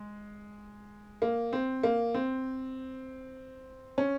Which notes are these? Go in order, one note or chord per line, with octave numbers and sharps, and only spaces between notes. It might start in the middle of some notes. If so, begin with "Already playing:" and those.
Already playing: G#3
A#3
C4
A#3
C4
C#4